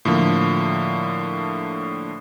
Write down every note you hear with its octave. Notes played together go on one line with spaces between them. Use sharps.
A2 D3 F3 A#3